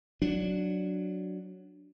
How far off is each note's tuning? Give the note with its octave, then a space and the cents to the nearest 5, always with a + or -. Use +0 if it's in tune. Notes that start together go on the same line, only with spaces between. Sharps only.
F#3 +0 D4 +0